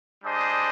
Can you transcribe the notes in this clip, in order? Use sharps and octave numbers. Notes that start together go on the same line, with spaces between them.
G3 D4 G#4 C5 D#5